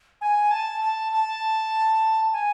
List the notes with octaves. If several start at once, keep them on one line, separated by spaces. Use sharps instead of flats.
G#5
A5
A5
A5
G#5